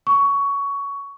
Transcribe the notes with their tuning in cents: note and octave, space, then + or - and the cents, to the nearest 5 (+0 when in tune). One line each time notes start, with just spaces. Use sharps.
C#6 +15